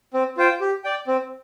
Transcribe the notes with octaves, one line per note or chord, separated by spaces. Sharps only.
C4
F4 C5 G5
G4
D5 G5
C4